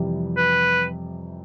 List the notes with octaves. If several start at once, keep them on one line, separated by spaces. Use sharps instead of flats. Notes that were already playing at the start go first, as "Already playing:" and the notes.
Already playing: F2 C3 E3 G3
B4